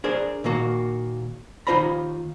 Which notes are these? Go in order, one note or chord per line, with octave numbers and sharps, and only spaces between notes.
D4 G#4 A#4 C5 D5
A#2 D#3 A#3 F#4
D#2 D#4 F4 C5 A#5 B5